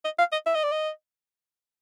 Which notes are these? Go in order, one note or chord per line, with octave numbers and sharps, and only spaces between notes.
D#5
F5
D#5
E5
D#5
D5
D#5